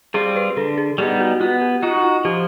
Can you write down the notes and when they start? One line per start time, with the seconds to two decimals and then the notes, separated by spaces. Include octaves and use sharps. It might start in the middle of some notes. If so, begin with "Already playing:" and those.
0.14 G3 C4 F4 G#4
0.36 B4
0.57 D3 A4
0.78 G#4
0.98 G3 B3 D#4 G4
1.20 F#4
1.40 B3 F4
1.61 G4
1.83 D#4 F4 F#4
2.03 F4
2.25 F3 G4